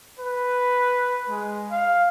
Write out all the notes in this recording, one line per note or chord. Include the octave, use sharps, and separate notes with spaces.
B4
G#3
F5